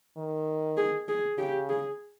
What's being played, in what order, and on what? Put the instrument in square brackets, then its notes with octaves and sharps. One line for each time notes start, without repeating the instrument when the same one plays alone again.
[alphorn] D#3
[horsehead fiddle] G#4
G#4
[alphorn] C#3 [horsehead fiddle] G4
[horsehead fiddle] G#4